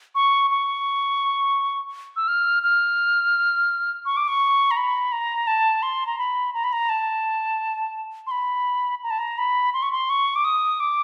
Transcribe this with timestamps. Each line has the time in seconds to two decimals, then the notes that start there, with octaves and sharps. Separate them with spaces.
0.15 C#6
0.51 C#6
2.16 E6
2.28 F6
2.63 F6
4.05 C#6
4.17 D6
4.28 C#6
4.71 A#5
4.77 B5
5.12 A#5
5.47 A5
5.83 C6
6.07 A#5
6.18 B5
6.54 A#5
6.64 B5
6.73 A#5
6.89 A5
8.27 C6
8.31 B5
9.03 A#5
9.10 A5
9.19 A#5
9.38 B5
9.74 C6
9.83 C#6
9.92 C6
10.10 C#6
10.36 D6
10.45 D#6
10.80 D6